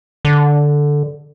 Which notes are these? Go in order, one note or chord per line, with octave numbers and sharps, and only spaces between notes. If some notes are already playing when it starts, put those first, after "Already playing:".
D3